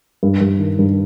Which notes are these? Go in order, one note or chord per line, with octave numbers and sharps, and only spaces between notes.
G2
G2
D#3
G2